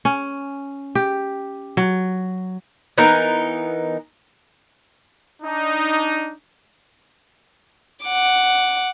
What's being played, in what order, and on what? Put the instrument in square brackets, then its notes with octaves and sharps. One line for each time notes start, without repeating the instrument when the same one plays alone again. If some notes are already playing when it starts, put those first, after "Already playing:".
[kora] C#4
G4
F#3
[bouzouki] E3 B3 D#4 A#4
[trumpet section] D4 D#4
[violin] F#5 D6